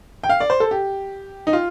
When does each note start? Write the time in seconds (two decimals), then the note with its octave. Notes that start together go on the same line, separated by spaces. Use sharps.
0.24 G5
0.29 F5
0.40 D5
0.50 C5
0.60 A4
0.71 G4
1.47 D#4
1.53 F4